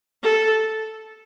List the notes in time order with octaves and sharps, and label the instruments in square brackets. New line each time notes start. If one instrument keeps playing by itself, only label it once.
[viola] A4